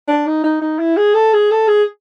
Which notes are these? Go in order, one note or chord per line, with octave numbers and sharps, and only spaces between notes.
D4
D#4
D#4
D#4
E4
G#4
A4
G#4
A4
G#4